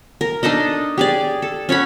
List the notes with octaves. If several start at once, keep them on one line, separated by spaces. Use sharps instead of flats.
A#4
D4 D#4 A4 D#5
G4 G#4 D5
A4
C#4 C#5 F#5 B5